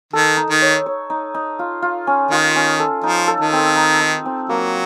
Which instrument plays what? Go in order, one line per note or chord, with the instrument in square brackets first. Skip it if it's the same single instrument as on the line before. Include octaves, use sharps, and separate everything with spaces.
[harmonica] D#3 [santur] A4
[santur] D#4
[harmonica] D#3
[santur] C#5
C#5
D#4
D#4
F4
F4
C#4
[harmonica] D#3 [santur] F4
[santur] C#4
A4
[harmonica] F3 [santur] D#4
[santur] A4
[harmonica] D#3
[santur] C4
D#4
D#4
C4
[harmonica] F#3 [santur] A#3